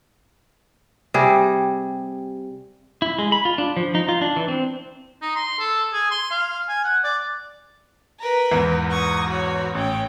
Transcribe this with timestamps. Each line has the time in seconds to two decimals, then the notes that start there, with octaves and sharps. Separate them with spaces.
1.14 C3 G3 G#4
3.02 E4
3.19 G#3
3.32 B5
3.45 F4
3.58 D4
3.77 F3
3.95 D#4
4.09 F4
4.21 D4
4.36 E3
4.48 C4
5.22 D#4
5.35 C6
5.59 A4
5.93 G#4
6.11 C6
6.31 F5
6.69 G#5
6.84 F#5
7.04 D5
8.19 A#4 B4
8.51 E2 G#2 E3
8.90 C#6 D#6
9.29 F#4 C#5
9.75 A1 C#4 G5